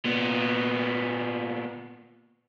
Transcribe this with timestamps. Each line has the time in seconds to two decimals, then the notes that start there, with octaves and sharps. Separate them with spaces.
0.05 A#2 B3